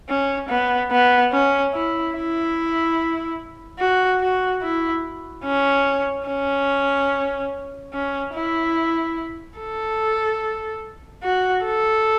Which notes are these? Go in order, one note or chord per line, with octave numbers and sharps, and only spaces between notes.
C#4
B3
B3
C#4
E4
E4
F#4
F#4
E4
C#4
C#4
C#4
E4
A4
F#4
A4